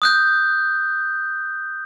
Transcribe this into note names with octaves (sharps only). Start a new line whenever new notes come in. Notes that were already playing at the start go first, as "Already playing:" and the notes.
D#6 F#6 G6